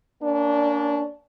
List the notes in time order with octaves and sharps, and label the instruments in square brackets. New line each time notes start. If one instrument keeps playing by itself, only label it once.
[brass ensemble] A#3 C#4 D4